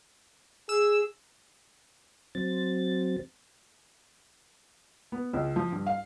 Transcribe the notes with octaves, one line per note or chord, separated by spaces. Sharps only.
G#4 E6
F#3 C4 A6
B3
C#2
F3
G2
F5